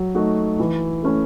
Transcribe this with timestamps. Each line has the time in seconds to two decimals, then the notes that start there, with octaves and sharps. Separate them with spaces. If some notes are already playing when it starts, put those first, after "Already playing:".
Already playing: F#3
0.15 A3 D#4 F#4
0.59 E3
1.03 A3 C#4